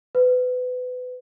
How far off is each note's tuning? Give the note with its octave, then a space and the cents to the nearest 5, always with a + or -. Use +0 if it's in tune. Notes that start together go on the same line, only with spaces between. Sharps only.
B4 +30